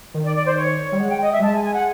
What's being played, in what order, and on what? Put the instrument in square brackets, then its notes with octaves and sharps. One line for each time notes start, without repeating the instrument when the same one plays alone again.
[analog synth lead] D#3
[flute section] D5
D5
C5
C#5
[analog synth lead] G3
[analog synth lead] G#3 [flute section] F#5
[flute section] G5
D#5
E5
[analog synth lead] G3
[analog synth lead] G#3 [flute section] A5
[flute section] G#5
G#5
F#5